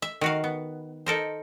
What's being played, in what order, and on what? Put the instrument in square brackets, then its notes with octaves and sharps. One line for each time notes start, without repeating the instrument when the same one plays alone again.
[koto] E5
D#3 F#4 F5
B3
D#4 A4 A#4 C5